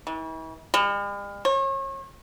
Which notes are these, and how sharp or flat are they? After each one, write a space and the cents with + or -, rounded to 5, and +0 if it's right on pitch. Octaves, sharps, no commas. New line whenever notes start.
E3 -40
G3 +45
C#5 -35